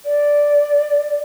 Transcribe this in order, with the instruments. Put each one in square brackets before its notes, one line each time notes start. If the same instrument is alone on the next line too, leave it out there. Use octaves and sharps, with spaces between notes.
[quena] D5